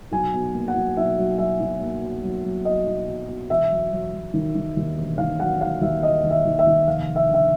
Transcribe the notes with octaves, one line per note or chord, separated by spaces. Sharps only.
B1 G#5
B2
A#3
F#5
B1
B1 E5
F#3
F#3 E5
B1
A#3
B2
F#3
F#3
B2 D#5
B1
B2
B2
E1 E5
F#3
F#3
F#3
D#3
D#3
D#2
E1
D#2 F5
F#3 F#5
E1 F5
D#2 E5
F#3 D#5
D#3
E5
D#2
E5
D#3
F1 F5
F1
E5
D3
E5